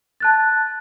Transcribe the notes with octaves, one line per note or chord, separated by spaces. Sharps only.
A5 F#6 A6